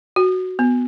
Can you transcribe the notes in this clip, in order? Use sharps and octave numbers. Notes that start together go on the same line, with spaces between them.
F#4
B3